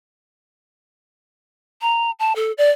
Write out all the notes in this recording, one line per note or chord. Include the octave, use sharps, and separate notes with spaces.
A#5
A5
A4
D5